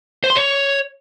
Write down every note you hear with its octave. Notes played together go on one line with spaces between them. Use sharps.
C5
C6
C#5